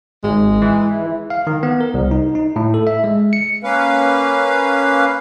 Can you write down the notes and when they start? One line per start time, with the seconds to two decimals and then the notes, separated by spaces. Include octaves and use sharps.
0.24 G#1 G#3
0.62 E3
1.30 F5
1.47 D#3
1.63 B3
1.81 A#4
1.94 C2
2.11 D#4
2.35 D#4
2.56 A2
2.74 A4
2.87 E5
3.04 G#3
3.33 C#7
3.64 A#3 C#4 B4 F5